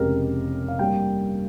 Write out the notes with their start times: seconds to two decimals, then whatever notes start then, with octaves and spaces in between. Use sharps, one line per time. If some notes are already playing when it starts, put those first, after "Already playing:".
Already playing: F1 F2 C#3 G#3 G4 A#4
0.68 F5
0.79 G2 G3 A#3 G5